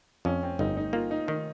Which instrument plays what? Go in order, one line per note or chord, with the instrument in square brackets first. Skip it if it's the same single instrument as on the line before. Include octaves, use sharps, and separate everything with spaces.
[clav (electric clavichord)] F2 [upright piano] C#4
[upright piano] C4
[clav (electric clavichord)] G1 [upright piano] D#4
[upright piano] D#4
[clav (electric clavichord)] A#3 [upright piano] F4
[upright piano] D#4
[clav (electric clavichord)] D#3 [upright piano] D#4